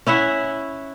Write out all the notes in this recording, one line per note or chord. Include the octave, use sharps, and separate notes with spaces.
C#4 E4 E5 F#5